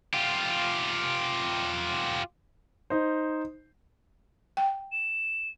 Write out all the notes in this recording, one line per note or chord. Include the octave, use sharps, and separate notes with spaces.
F4 G4
D#4 C5
G5
E7